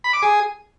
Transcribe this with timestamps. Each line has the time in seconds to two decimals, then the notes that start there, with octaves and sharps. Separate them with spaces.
0.04 B5
0.13 D6
0.22 G#4